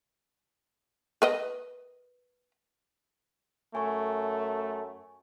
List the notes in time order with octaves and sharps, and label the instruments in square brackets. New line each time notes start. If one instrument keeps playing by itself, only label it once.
[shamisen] A#4 B4 D#5
[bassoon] F#2 [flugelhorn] A3 [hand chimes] G#5 C#6